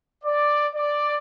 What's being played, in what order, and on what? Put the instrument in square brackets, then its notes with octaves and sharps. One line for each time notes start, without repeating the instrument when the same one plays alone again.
[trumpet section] D5
D5